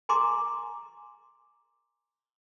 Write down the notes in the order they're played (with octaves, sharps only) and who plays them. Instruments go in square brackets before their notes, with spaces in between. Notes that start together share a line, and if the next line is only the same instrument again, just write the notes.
[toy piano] G#5 A#5 C6 D6